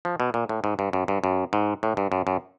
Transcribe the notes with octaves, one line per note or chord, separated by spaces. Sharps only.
F3
B2
A#2
A2
G#2
G2
F#2
G2
F#2
G#2
A2
G2
F#2
F#2